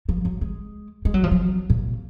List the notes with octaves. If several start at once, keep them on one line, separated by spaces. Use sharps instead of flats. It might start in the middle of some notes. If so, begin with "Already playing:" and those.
F3
F#3
G#3
G#3
F#3
F3
F#3
A#2